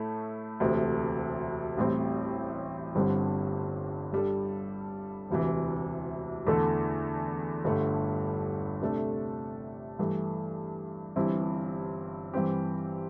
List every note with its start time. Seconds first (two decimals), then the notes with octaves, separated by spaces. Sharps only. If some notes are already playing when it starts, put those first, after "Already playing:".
Already playing: A2 A3 E4 A4
0.60 E1 D2 C3 A3 C4
1.78 A1 A2 G3 C4
2.95 G1 G2 D3 G3 C4
4.12 G2 G3 D4 A4
5.30 E1 D2 C3 E3
6.47 E2 D3 A3 E4 A4
7.64 G1 G2 D3 A3
8.82 C3 A3 D4 A4
9.99 G2 E3 A3
11.16 G1 G2 E3 C4 E4
12.34 G2 E3 G3 C4 G4